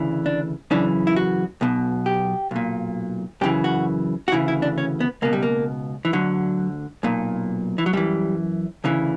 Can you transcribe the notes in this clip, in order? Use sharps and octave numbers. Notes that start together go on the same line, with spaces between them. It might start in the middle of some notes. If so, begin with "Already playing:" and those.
Already playing: D2 C#3 E3
D4
F#2 C#3 E3 D4
E4
F#4
B1 B2
G4
B1 A#2
F#2 C#3 E3 G4
F#4
F#4
D2 C#3 E3 E4
E4
D4
C#4
B3
C#2 B2 A#3
G3
A#3
E3
D2 D3 F#3
B1 A#2
E3
F#3
F#2 E3 G3
D2 C#3 E3